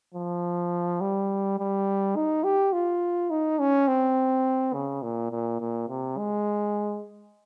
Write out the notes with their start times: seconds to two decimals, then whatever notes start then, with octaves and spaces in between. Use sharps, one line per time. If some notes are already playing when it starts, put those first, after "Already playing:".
0.15 F3
1.01 G3
1.59 G3
2.16 D#4
2.44 G4
2.73 F4
3.31 D#4
3.59 C#4
3.88 C4
4.74 C#3
5.03 A#2
5.31 A#2
5.60 A#2
5.89 C3
6.18 G#3